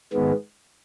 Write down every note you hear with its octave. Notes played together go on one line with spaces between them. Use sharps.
G#2 D#3 G#3 B3